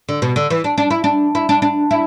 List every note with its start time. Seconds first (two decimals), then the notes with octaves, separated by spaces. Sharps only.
0.09 D3
0.22 B2
0.36 D3
0.50 E3
0.64 D4
0.78 D4
0.91 E4
1.04 D4
1.35 E4
1.49 D4
1.62 D4
1.91 E4